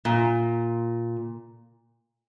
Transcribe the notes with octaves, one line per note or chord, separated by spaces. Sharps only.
A#2